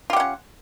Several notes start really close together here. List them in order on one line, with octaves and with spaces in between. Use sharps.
F4 G4 F#5 C#4